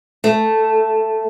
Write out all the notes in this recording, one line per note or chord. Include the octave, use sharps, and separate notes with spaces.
A3